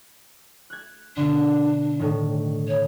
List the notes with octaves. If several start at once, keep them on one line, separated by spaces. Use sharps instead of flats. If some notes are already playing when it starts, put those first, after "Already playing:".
F#6 G#6
B2 D3 D4
A2 D#3
C#5